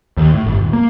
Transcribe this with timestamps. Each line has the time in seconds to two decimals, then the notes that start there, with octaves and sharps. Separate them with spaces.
0.17 D#2
0.34 A2
0.46 G1
0.59 D#1
0.73 A#3